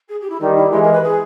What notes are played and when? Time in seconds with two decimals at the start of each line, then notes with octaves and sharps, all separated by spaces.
0.08 G#4
0.21 G4
0.29 E4
0.40 D#3 G3 D#4
0.56 E4
0.71 E3 G#3 G4
0.82 A#4
0.92 B4
1.03 G#4